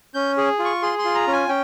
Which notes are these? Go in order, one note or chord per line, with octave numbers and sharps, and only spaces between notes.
C#4 G6
G#4
F4
C#6
G#4 C6
C6
F4
A#5
C#4
G#5
C#4 G5